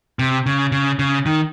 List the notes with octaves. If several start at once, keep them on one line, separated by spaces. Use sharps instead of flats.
C3
C#3
C#3
C#3
D#3